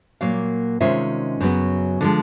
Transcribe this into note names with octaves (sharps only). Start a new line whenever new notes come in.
A#2 F#3 A#3 F5
C3 D#3 G#3 C#4 F4 E5
F#2 C#3 F#3 B3
D3 F3 G#3